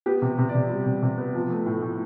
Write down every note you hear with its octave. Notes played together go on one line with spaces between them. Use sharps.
B3 G4
C3
C3
D5
C3
G3
C3
C3
B3
F3
A3
A2
A2